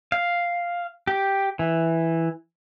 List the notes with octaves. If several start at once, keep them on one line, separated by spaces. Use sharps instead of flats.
F5
G4
E3